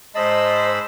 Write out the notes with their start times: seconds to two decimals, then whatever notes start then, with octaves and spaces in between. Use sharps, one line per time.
0.15 G#2 C5 D#5 A5 B5 E6